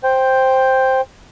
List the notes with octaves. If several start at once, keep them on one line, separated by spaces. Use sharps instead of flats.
C5 G5